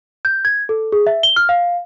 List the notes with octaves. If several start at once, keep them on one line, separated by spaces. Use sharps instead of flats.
G6
G#6
A4
G#4
E5
G7
F6
F5